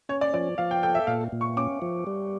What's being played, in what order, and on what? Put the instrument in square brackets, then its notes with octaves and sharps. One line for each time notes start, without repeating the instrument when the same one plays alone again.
[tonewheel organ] C#4 [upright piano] C#5
[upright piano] D5
[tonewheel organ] F3 [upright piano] D5
[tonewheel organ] F3 [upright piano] F5
[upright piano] G5
[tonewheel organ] A4 [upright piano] G5
[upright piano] E5
[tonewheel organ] A#2 [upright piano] F5
[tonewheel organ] A#2
[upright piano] C#6
[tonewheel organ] C#4 [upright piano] D6
[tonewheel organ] F3
G3